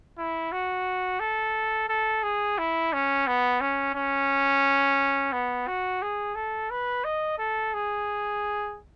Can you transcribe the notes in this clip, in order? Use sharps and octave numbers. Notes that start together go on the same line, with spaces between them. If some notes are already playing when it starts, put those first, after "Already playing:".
E4
F#4
A4
A4
G#4
E4
C#4
B3
C#4
C#4
B3
F#4
G#4
A4
B4
D#5
A4
G#4